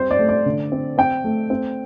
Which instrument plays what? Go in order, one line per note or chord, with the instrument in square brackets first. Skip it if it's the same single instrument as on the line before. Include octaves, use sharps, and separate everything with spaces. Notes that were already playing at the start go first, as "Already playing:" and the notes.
Already playing: [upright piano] G3 C4 C5
D5
A3
D5
D3
C4
C4 G5
A3
C4